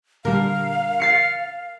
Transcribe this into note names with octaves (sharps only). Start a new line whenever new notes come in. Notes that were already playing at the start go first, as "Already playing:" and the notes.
A#2 D3 G3 A#4 F5
A6 C7 C#7